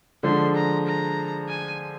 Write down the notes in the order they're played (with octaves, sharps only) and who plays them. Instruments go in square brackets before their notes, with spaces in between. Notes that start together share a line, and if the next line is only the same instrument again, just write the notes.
[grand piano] D3 F3 G#3 D4 [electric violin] C6
[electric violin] A#5
A#5
G#5